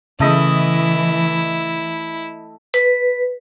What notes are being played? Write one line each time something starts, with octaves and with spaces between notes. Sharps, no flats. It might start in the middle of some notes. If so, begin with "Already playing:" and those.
C#3 E3 A3 E4 D#5
B4